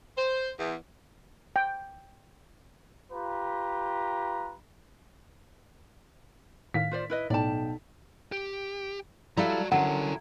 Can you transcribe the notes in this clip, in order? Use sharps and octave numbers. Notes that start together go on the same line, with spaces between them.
C5
E2
G5
F4 G4 B4 A#5
A2 D#3 F5 B6
F4 C5 D5
E4 B4 D#5
B1 A2 D5 G5 A5
G4
G3 E4 F#4 A4 F5 A#5
D3 F#3 C#4 E4 A#4 F#5